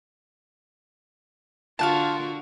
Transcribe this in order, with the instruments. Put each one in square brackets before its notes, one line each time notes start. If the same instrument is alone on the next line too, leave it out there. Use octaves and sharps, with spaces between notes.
[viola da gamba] D3 F#4 A#4 [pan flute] F4 [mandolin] F5 F#5 A5